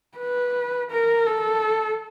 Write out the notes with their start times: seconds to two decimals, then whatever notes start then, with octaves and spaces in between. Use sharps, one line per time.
0.18 B4
0.91 A#4
1.27 A4